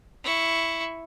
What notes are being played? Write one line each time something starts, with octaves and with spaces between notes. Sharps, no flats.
E4 C#6